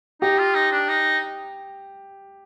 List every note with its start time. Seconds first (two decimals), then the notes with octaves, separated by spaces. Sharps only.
0.22 D#4 G4
0.39 F4
0.55 D#4
0.72 D4
0.88 D#4